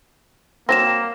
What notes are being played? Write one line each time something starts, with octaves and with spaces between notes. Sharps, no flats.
F#3 A#3 C4 A#6 E7